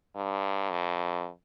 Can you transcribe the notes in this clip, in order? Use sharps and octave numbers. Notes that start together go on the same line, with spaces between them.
G2
F2